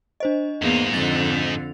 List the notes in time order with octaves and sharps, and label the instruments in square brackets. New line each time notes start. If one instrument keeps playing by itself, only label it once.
[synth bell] D4 C5 D#5
[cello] E2 A#3 [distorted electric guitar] G#2 D#4
[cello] F2 D3 [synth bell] A6 F7